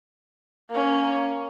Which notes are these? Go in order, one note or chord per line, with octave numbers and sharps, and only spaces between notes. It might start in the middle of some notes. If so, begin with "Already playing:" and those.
A#3 C#4